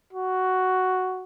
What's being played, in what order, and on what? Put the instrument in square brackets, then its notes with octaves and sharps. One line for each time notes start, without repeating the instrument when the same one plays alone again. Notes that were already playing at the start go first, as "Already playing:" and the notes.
[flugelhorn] F#4